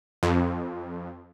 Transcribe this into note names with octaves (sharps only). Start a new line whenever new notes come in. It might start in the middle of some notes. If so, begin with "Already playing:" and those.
F2